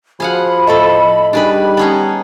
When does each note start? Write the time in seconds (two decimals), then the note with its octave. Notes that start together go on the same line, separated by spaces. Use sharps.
0.20 F3 F#4 G#4 F5 F#5 B5 G#6
0.67 A2 A3 A4 D#5
1.33 G3 D4 D#4 G4 G#4 B4 D#5 B5
1.77 B3 C#4 D#4 A5 G#6 C7